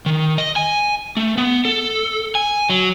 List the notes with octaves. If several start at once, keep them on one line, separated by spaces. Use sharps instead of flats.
D#3
D#5
G#5
A3
B3
A4
G#5
F#3